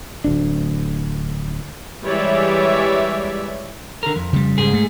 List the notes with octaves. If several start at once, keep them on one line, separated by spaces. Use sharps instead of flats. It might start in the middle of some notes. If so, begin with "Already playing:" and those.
D1 D2 D4
E3 G3 G#3 C#5 D5 E5
D3 A#4
F2
C#3 G3
G#2 G#4
A3